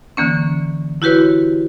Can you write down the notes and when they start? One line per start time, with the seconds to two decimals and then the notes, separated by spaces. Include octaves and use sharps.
0.17 D3 E3 A#3 C#4
1.02 E4 F#4 G4 B4 C#5